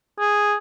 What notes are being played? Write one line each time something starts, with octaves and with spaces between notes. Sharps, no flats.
G#4